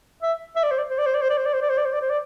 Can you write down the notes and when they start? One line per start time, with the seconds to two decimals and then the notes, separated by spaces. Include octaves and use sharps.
0.23 E5
0.56 E5
0.64 D5
0.71 C5
0.78 D5
0.90 C5
0.98 D5
1.06 C5
1.15 D5
1.22 C5
1.30 D5
1.38 C5
1.46 D5
1.54 C5
1.62 D5
1.70 C5
1.78 D5
1.85 C5
1.93 D5
2.01 C5
2.10 D5